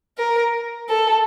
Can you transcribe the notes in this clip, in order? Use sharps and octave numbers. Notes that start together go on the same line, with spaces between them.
A#4
A4